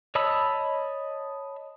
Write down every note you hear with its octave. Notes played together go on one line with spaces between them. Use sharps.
C#5 D#5 A5 B5 E6